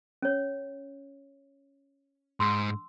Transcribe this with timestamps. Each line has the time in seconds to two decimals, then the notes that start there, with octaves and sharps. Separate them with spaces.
0.22 C#4 C#5
2.40 G#2 C6 E6